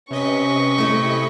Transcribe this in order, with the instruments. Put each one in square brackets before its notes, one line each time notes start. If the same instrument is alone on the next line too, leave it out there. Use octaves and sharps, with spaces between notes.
[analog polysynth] C3 D#5 B6 [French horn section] C#4 B4 [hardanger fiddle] C#6
[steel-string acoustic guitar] A3 E4